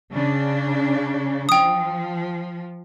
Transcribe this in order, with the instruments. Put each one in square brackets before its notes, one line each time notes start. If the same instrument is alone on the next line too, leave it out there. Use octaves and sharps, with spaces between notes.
[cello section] C#3 D4
[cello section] F3 [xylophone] G5 D#6